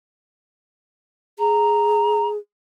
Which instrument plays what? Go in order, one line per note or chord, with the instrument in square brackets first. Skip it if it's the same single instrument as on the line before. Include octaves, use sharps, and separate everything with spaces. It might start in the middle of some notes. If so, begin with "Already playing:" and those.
[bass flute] G#4 [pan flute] A#5